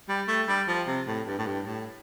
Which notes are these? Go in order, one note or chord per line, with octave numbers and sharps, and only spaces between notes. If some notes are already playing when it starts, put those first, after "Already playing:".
G3
A3
G3
F3
C3
A2
G2
A2
G2
A2